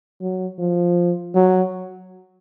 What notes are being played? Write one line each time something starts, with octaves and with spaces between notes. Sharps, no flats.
F#3
F3
F#3